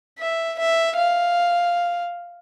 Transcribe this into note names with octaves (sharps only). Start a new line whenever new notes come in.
E5
E5
F5